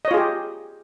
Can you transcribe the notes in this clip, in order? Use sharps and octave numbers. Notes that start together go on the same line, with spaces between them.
F4 G4 G#4 C#5 D#5